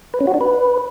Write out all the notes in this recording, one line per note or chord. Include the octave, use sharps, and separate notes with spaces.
B4
C#4
F#4
D4
B4